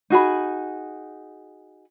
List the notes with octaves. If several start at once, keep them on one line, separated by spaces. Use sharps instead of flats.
D#4 F#4 G#4 B5